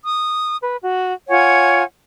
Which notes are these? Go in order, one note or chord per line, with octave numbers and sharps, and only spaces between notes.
D#6
B4
F#4
F4 C#5 F#5 G#5